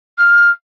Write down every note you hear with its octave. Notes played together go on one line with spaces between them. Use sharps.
F6